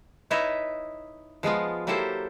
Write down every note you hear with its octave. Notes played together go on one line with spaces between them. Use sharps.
D#4 E4 B4 C#5 D#5 E5
F3 G#3 B3 F4
F#3 A#3 E4 G4 A4 C5